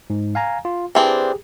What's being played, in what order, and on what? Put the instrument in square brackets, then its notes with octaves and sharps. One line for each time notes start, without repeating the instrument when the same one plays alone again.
[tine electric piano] G#2
F5 G#5 A#5
F4
[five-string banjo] E3 C4 D4 [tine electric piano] G4 G#4